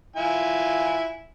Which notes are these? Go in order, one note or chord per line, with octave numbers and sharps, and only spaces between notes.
E4 F4 G#5